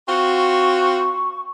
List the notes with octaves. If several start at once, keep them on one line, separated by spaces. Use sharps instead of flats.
C4 F4 F#4 C#6